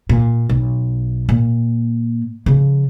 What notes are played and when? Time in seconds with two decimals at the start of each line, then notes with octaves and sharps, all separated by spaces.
0.09 A#2
0.49 B1
1.29 A#2
2.46 C#3 F3